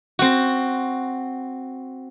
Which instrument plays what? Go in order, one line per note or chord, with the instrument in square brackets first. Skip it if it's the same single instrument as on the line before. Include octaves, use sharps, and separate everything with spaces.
[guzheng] C4 F#4